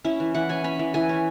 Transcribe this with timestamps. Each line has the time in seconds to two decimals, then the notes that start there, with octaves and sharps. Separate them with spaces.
0.05 C#4 E4
0.20 E3
0.35 E3 F#5
0.49 C#4 G#5
0.64 C#4 B5
0.79 E3
0.94 E3 G#5
1.09 C#4